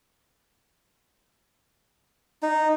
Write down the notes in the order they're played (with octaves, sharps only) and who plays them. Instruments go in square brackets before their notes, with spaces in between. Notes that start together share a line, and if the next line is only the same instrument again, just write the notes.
[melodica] D#4